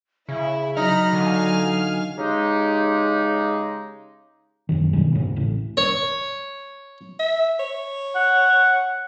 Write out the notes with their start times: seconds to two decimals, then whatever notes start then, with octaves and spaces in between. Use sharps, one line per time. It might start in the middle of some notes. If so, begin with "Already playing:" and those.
0.29 C#3 E4 E5
0.77 F#3 D#4 A#5 B5 F6
1.13 D3 F5 G#5 F6
2.18 C#3 G#3 D#4 G4
4.69 D#1 C2 F#2 D#3
4.93 G2 B2 D#3 G#3
5.15 D#2 G#2 C#3
5.36 A1 A2
5.77 C#5
7.19 E5
7.60 C#5
8.15 F#5